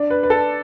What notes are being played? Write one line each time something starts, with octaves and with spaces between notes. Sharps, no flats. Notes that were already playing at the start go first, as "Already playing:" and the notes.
Already playing: D4
B4
B4
A4